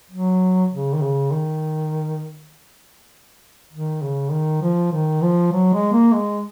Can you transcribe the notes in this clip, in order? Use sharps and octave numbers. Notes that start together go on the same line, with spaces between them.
F#3
C#3
D#3
C#3
D#3
D#3
C#3
D#3
F3
D#3
F3
F#3
G#3
A#3
G#3